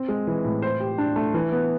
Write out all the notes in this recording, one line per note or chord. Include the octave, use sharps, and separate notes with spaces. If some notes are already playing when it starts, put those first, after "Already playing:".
Already playing: C4
G#3
E3
A2
C5
G4
D4
A3
E3
B3